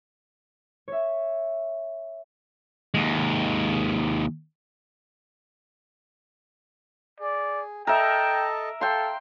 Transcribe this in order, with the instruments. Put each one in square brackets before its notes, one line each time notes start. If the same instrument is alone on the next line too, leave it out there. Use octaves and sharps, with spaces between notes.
[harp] C#5 E5
[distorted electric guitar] D#2 G#3
[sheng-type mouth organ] G#4 [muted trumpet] D5
[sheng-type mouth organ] A4 D#5 A5 [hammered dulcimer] A#4 E5 [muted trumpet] G5
[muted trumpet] A4 [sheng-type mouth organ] F5 [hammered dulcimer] G5 C6